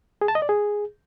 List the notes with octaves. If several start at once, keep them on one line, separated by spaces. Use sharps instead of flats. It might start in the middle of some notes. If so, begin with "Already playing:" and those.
G#4
A5
D#5
D5
G#4